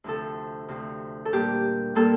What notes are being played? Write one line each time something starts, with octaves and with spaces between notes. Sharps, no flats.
D2 C3 F3 A4
D2 C3 F3
A4
A#2 G3 A#3 G4
A#2 G3 A#3 A4